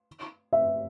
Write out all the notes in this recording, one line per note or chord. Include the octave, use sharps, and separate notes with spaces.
E5